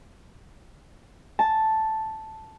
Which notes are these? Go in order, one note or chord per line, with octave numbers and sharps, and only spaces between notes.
A5